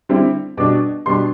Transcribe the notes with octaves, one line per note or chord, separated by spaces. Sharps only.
D3 G3 C4 E4
B2 G3 D4 D6
B2 G3 D4 C6